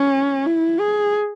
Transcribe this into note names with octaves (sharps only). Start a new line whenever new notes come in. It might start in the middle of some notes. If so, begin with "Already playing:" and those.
Already playing: C#4
E4
G#4